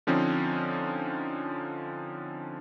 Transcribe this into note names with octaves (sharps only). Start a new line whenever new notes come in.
D3 F3 C4 C#4 D#4